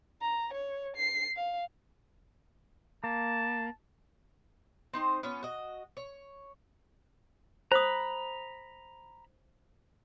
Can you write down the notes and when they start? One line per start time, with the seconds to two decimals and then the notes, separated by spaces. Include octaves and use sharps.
0.21 A#5
0.53 C#5
0.96 C7
1.36 F5
3.04 A#3 A5
4.94 C4 D#4 C5
5.23 B3 C#4 F4 C#5
5.43 F#4 D#5
5.97 C#5
7.72 C5 A#5 B5 D#6